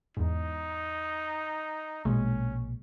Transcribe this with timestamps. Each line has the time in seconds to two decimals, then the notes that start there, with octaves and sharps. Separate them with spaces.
0.17 E2 G#2 D#4
2.05 A#1 B2 G#3 A#3 C#4